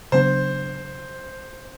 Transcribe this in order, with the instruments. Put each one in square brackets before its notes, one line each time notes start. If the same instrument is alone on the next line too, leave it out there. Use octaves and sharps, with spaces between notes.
[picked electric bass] C#3 F#3 B3 D4 [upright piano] C5